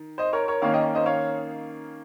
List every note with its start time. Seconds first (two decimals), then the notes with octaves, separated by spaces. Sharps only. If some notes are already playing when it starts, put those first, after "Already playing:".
Already playing: D#3
0.18 C5 D#5
0.33 A#4 C#5
0.48 A#4 C#5
0.62 D#3 A#3 C#4 C#5 F5
0.74 D#5 G5
0.95 C5 D#5
1.06 C#5 F5